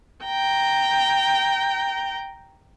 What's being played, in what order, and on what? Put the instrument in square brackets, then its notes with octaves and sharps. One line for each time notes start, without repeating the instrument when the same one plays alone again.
[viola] G5 A#5